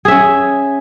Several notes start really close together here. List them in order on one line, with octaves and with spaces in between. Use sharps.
G#4 E5 C#4